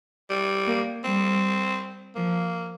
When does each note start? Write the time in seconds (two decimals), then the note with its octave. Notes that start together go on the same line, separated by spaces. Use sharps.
0.30 G3
0.67 A#3
1.04 G3 C4
2.15 F3 A#3